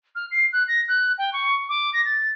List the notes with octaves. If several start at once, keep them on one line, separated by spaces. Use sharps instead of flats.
F6
C7
F#6
A#6
F#6
G5
C#6
D6
A#6
A6